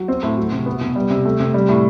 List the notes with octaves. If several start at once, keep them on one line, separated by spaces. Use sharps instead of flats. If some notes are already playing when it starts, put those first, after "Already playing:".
Already playing: F#3
C4
A2
F#3
C3
B3
B2
G3
C3
A3
C3
G3
A2